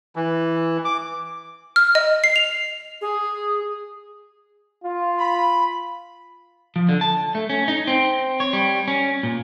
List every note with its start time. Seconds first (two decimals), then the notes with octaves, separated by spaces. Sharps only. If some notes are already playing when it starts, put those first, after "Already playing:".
0.16 E3
0.85 D6
1.76 F6
1.95 D#5
2.24 C7
2.36 F7
3.01 G#4
4.84 F4
5.19 B5
6.76 F3
6.89 D3
7.01 A5
7.35 A3
7.50 C#4
7.68 D#4
7.88 C4
8.40 C#5
8.53 G3
8.88 C#4
9.23 A#2